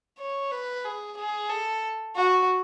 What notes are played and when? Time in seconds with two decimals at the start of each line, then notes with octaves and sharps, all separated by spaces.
0.19 C#5
0.51 B4
0.85 G#4
1.17 G#4
1.50 A4
2.16 F#4